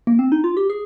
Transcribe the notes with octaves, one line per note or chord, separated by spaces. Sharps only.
A#3
C4
D#4
F4
G4
G#4